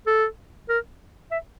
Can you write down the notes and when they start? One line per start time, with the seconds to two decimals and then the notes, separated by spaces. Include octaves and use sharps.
0.07 A4
0.69 A#4
1.31 E5